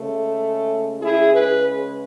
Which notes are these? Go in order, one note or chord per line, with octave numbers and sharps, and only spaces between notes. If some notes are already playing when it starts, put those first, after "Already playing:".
Already playing: C#3 G#3 A3
E4 G#4
G#4 B4